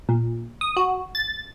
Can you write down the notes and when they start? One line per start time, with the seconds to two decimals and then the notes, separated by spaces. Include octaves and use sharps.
0.09 A#2
0.61 D#6
0.77 F#4
1.15 A6